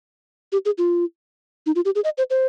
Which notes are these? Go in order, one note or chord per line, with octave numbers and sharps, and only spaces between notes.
G4
G#4
F4
D#4
F4
G4
G#4
D#5
C5
C5